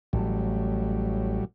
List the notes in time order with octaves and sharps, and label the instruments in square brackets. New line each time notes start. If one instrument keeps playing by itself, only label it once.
[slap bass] A1 [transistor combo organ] A2 F#3 G3